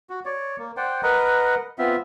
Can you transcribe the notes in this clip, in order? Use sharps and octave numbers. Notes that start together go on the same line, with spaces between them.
F#4
C#5 D5
A#3
C5 D5 F#5 G5
A#4 B4 D#5 F#5
B3 C4 F4 E5